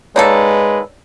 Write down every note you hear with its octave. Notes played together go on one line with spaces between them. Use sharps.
D#3 G#3 A#3 A4 B4 C#5 D5